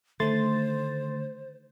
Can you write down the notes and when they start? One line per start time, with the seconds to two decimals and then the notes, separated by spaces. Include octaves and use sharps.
0.20 D3 D#3 A3 C5 C6 A6